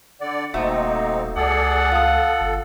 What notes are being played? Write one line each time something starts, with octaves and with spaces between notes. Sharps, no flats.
D3 D5 F#5
D#1 A3 A#3 C4 D#4 F#4
C#2 G#4 A4 D5 F#5
F4 A4 D#6
G1